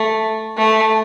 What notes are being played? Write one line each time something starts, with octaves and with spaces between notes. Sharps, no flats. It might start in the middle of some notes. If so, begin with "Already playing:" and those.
Already playing: A3
A3